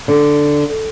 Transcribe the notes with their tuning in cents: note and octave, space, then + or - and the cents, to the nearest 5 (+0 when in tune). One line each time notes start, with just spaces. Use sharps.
D3 +0